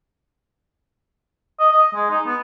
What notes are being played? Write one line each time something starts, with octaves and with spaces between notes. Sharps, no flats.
D#5
D#5
G#3
D#4
B3